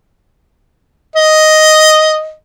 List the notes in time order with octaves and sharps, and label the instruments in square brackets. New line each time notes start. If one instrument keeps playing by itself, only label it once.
[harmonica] D#5